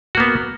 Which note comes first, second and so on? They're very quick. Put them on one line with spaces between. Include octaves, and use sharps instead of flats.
F#4 A#3 B3